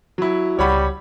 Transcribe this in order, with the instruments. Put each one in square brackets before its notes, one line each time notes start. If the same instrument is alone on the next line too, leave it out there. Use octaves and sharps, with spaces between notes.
[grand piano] F#3 E4
[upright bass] C#2 [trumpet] G3 [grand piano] C#5 F#5 B5